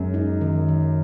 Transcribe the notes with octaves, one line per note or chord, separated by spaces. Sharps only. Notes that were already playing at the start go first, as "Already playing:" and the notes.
Already playing: F#2 G#3
D#4
D#3
D#3